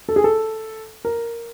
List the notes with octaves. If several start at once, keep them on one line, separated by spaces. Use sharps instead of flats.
A4
G#4
A4
A#4